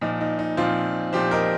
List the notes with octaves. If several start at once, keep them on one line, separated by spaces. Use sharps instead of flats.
A#2 F3 D#4
D#4
D#4
A#2 F3 C4 F4
A#2 F3 G4 C5
A#4 D#5